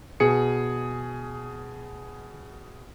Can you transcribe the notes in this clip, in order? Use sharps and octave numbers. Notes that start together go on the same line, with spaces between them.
B2 G#4 C#7